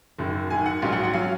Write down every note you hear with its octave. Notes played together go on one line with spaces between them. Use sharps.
F#1 F#2 D#3
F#1 F#2 D#3 G#5
F#5
A#1 G#2 F#3 C#4 F5
F#5
F#5
F#3 C#4 F5